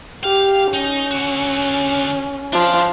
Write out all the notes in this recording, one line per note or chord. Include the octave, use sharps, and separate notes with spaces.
G4 F5
C#4 D#4
D3 F#4
F3 D4